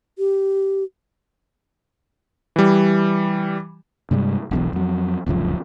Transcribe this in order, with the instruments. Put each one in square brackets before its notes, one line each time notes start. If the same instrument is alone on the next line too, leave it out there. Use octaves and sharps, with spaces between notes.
[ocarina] G4
[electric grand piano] E3 G3
[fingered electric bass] G2 C3 G3 G#3
E1 B1 E2
F2 F#3
D1 C#2 F#2 F3